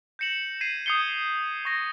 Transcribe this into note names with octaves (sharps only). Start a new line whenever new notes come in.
G6 A#6 C#7 E7 F#7
G#6 B6 C7 D#7 E7 F#7
D#6 G6 G#6 C7 C#7 G7
C#6 A#6